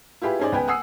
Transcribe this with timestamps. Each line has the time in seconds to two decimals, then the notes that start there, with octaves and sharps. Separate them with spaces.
0.22 E4 F4 G4 G#4 B4
0.39 C#4 D#4 G#4 C5 D5
0.52 C#2 B3 B4 G5 G#5
0.68 F#5 G#5 D#6 E6 C7